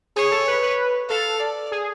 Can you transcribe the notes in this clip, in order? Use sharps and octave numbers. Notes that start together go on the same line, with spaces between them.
G#4 C#5
A4
B4
B4
A4 F5
D5
G#4